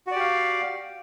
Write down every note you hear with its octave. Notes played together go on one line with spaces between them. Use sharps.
F#4 G4 D5 F5